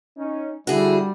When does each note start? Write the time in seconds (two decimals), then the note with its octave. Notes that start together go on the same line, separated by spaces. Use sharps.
0.17 C#4 D#4
0.67 D3 G3 E4 F#4 G#4